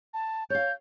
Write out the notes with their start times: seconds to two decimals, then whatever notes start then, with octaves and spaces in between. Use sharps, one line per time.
0.14 A5
0.50 C#5 F5 G6